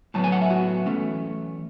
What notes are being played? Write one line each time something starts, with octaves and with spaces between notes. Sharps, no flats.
A2 F#3 B3 A5
G#5
F#5
E5
F#4
E3 A3 C#4